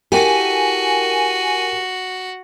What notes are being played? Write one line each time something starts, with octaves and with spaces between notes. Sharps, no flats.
E4 F#4 G4 A4 A#4 G5 G#5